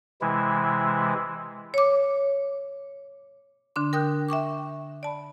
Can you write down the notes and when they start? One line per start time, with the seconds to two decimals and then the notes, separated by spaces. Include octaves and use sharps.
0.21 C3 E3 G#3 E4
1.74 C#5 D6
3.76 D3 D4 C6
3.93 A#4 G5 D#6 F#6 G6
4.29 E5 G5 C#6 D6
5.03 D5 A5 B5